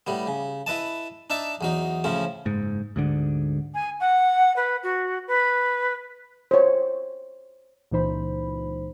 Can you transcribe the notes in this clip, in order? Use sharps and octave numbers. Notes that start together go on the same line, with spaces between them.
A2 G3 B3
C#3
E4 B4 D#5 A5
D4 D#4 E5 A5
E2 F#3 D#4
A2 C#3 F3 C#4
F#1 G#2
D2 G#2 D3
G#5
F#5
B4
F#4
B4
C5 C#5
C#2 A#2 E3 D#4 C5 B5